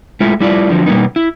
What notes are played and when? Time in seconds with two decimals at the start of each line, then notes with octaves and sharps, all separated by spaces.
0.20 G#3 A3 E4 F4
0.40 G3 E4 F4 D5
0.69 D3 F3 F#3
0.86 B2 G3 A#3 B3 D#4
1.16 E4